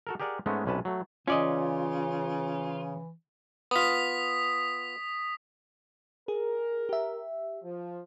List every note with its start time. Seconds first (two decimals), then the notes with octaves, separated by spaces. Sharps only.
0.07 F#4 A4 A#4
0.20 G4 G#4 A#4 D5 F#5
0.46 G#2 G#3 A3 B3 C#4
0.66 B1 C3 C#4 B4 A5
0.85 F#3 A3
1.28 C#3 E3 C#4 F4 D5 D#5
3.71 B3 F4 D#6 B6
6.28 G#4 A#4
6.89 G4 E5
7.63 F3